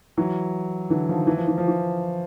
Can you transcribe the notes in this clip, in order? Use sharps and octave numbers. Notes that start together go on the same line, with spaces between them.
E3 F#3
D3 E3
D#3 F3
E3
F3
E3
F3
E3